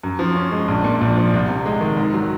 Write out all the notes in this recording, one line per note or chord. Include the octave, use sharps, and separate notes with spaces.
F#2
F3
C#4
G#3
A#1
A#2
A#1
F3
C2
C3
G#3
D#3
G#2
F#3